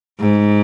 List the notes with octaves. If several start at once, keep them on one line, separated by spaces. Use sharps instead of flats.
G#2